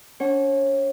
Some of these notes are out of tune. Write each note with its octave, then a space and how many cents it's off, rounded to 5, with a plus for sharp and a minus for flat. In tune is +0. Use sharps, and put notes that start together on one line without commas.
C#4 +45 C#5 -30 F#5 +25